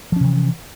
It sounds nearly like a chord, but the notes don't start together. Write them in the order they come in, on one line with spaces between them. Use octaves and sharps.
F3 C#4 C3 E3